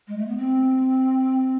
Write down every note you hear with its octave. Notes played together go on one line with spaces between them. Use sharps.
G#3
A3
B3
C4